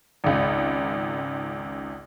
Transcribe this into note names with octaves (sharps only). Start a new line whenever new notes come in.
G#1 C#2